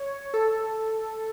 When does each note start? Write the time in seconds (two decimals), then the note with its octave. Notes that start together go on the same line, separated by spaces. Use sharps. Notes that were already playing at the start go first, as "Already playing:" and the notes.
Already playing: C#5
0.34 A4